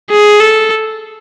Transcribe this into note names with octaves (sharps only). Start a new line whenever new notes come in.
G#4
A4